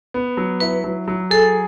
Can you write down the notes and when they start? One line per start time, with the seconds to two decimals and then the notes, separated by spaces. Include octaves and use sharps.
0.14 B3
0.37 F#3
0.60 E4 B4
0.84 F#3
1.08 F#3
1.30 G#4 A4